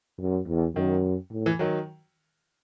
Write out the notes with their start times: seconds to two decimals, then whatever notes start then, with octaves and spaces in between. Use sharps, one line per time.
0.19 F#2
0.47 E2
0.76 F#2 D#3
1.32 A2
1.46 E3
1.59 D#3 F#3